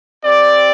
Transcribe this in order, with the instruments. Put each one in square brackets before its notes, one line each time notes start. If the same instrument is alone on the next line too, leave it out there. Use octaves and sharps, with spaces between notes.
[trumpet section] C4 G4 D5